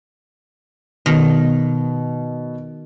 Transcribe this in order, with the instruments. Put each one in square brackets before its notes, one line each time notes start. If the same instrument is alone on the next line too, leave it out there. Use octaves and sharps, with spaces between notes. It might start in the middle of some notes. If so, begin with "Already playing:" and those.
[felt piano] B2 [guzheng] D#3